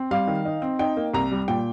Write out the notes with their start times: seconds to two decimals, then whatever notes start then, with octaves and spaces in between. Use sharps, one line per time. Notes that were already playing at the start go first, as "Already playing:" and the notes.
Already playing: C4
0.11 G3 F5
0.28 D#3
0.45 D#4
0.62 C4
0.79 D#4 G5
0.97 A#3
1.14 C2 A#5
1.32 G3
1.48 A#2 G5